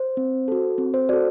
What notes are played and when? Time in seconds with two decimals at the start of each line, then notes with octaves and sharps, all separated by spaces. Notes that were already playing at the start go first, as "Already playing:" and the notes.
Already playing: C5
0.17 C4
0.48 F#4 A4
0.78 C4
0.94 C5
1.09 F#4 A4 D5